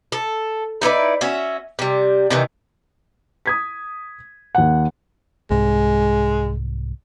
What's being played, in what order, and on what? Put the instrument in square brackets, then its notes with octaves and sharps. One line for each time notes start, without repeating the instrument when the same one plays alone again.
[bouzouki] A4
D#4 E4 B4 D5
C#4 F#4 E5
C3 G3
C3 D#3 E3
[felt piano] D#6 G#6 B6
D#2 F#5
[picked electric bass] C2 G#2 [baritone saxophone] G#3